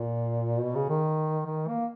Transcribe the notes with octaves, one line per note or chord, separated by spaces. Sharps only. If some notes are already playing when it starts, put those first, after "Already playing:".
Already playing: A#2
B2
C#3
D#3
D#3
A#3